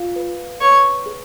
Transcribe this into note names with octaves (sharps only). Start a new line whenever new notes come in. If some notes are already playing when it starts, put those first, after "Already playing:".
Already playing: F4 F5
B4
B4 C#5
G#4